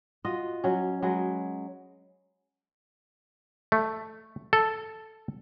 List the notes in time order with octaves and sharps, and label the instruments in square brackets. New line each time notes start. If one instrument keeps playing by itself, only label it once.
[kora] F4 F#4 D#5
F#3 C#4
F#3 G#3 B4
[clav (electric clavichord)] A3
A4